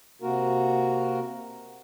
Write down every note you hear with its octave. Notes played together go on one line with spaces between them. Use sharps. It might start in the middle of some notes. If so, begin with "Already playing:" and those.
C3 A#3 F#4 A#4